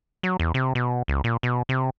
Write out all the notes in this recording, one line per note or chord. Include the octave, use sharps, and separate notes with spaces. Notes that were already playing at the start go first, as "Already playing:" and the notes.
F#3
E2
C3
B2
C#2
A#2
B2
C3